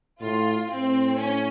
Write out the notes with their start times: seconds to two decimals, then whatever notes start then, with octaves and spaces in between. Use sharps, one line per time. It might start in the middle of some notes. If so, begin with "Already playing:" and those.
0.20 A2 F4
0.69 A2 C4
1.18 C#4